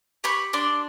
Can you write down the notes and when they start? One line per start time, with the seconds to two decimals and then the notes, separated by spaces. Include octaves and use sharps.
0.24 G4 B5 C#6
0.53 D4 C6 D6